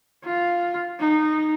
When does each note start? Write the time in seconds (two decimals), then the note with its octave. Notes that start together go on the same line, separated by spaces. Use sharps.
0.24 F4
1.00 D#4